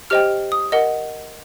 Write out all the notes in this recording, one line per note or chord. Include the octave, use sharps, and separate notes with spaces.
G4 C5 D#5 G5 F6
D#6
A#4 D#5 F#5